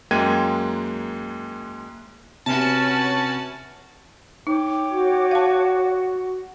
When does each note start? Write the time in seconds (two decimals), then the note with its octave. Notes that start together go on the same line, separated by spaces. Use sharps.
0.11 F#2 G#3 A#3 G5 G#6 D#7
2.46 C3 C#4 F#4 B4 A5
4.47 D#4 C#5 G5 D6
4.91 F#4
5.31 F5 A5